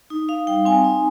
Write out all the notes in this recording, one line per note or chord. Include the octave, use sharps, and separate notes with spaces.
D#4
D#4 F5
G3 G5
C4 G#5
D#4